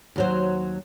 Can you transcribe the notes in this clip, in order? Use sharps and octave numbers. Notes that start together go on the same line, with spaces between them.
D#2 F#3 C5